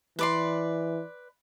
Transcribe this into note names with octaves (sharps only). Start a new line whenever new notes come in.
E3 B4 D5 C6